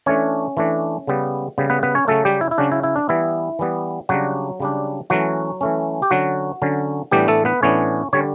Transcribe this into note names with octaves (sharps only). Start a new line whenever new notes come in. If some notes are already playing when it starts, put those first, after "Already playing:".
E3 A3 C#4 D4 C#5
E3 A3 D4
C#3 G3 B3
C#3 G3 B3
B3 B4
B3 B4
C#4 C#5
C#3 F#3 A3 C#4 A4
G3 G4
E4
E4
C#3 F#3 C#4 D4
E4
E4
D4
E3 G3 B3 E4
E3 G3 B3
C#3 F#3 G3 D4 F#4
C#3 G3 D4
E3 F#3 A3 C#4 F#4
E3 A3 C#4
G4
D3 F#3 C#4 F#4
D3 F#3 C#4
A2 E3 G3 B3 D4 G4
A3 A4
B3 B4
A2 E3 B3 C#4 D4 C#5
D3 G3 C#4 C#5